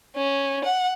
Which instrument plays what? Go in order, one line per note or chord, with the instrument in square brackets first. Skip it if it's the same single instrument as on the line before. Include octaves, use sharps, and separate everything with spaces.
[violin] C#4
F#5